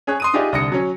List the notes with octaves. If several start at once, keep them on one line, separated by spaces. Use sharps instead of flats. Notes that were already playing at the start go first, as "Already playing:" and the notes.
C#4 G#4 C#5 F#6
C6 D#6 D#7
D#4 F4 G4 G#4 D5 E5
C2 D3 D#6 A#6 C#7
F#3 C#4